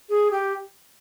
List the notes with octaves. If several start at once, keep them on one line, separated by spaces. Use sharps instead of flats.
G#4
G4